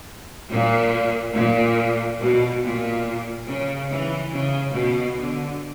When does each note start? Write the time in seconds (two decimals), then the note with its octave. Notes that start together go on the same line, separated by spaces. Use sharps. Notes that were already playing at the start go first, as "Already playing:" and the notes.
0.50 A#2
1.35 A#2
2.19 B2
2.63 A#2
3.48 C#3
3.90 E3
4.32 C#3
4.74 B2
5.17 D3